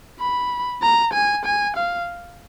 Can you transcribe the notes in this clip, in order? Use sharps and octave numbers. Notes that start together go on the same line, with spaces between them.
B5
A#5
G#5
G#5
F5